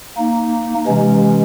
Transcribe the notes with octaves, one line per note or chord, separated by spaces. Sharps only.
A#3 D#4
C3 E3 G#3 C#4